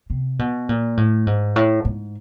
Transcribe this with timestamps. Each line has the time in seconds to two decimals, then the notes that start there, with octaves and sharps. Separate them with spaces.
0.10 C3
0.39 B2
0.69 A#2
0.97 A2
1.27 G#2
1.56 A2
1.85 G#2